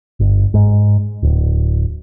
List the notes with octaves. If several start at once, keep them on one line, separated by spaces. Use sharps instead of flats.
G1
G#2
D1